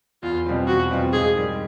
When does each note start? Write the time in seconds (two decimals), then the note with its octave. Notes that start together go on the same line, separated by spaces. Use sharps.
0.23 E2 F4
0.46 B2 G3 C4 F4
0.68 E2 F#4
0.91 B2 G3 C4 F4
1.13 G#2 G#4
1.36 D#3 G3